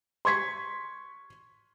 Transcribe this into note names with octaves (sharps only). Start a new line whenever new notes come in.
C6 C#6 G#6 B6